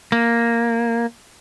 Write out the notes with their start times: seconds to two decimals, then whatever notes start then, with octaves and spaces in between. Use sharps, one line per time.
0.12 A#3